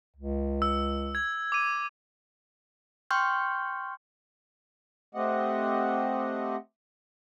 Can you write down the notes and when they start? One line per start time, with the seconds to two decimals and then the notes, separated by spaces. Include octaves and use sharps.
0.16 C#2
0.62 E6
1.15 G#6
1.52 D6 D#7
3.11 G5 C6 C#6 F6 G6
5.15 A3 C4 G4 D#5 F#5